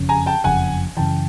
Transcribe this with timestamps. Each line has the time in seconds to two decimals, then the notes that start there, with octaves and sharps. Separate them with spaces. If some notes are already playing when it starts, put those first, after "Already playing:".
Already playing: F#1 F2 C#3
0.09 G#5 A#5
0.26 G5 A5
0.44 F#1 F2 C#3 F#5 G#5
0.97 F#2 C#3 E3 G5 A5